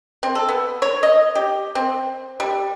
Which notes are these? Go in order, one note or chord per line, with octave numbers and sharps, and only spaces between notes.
C4
A4
B3
C#5
D#5
G4
C4
G3